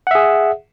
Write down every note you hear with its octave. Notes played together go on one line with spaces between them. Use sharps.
G#4 E5 F#5